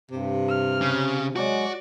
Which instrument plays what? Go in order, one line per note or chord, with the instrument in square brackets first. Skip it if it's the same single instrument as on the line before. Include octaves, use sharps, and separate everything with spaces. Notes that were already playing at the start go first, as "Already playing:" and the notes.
[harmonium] G2 [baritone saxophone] C3
[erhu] F6
[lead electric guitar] C#3
[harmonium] F#3 G#3 [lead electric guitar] F#4 [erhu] D5